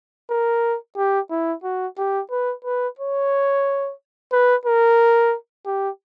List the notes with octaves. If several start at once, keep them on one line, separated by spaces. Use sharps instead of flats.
A#4
G4
E4
F#4
G4
B4
B4
C#5
B4
A#4
G4